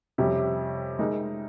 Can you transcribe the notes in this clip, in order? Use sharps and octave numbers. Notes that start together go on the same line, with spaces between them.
F2 C3 G3 C#4 G4
G#3 D#4 A#4